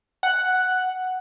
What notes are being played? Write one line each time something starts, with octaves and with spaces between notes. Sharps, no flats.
F#5